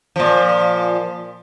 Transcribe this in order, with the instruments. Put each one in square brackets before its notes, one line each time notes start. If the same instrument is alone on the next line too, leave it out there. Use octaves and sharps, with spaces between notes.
[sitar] A#2 F3